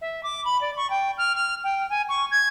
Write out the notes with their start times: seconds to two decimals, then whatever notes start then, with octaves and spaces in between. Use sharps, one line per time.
0.01 E5
0.23 D6
0.45 B5
0.61 D5
0.77 C#6
0.90 G5
1.18 F6
1.35 F6
1.64 G5
1.90 G#5
2.09 C#6
2.31 G#6